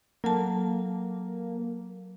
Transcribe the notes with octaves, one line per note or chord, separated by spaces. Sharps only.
F#3 A#3 A4 A5